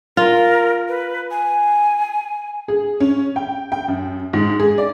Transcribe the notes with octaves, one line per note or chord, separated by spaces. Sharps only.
F4 A#4
B4
G#5
G#4
C#4
G5
G5
F#2
G#2
G#4
D5